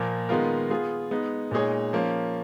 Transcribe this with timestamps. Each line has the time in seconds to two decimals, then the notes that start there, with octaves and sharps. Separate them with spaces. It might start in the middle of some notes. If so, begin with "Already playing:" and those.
Already playing: A#2 F3 A#3
0.29 D#3 G#3 B3 F4 A#4
0.70 B3 F4 G#4
1.11 G#3 B3 D#4
1.51 A#2 G#3 D#4 G#4 C#5
1.93 F3 A#3 C#4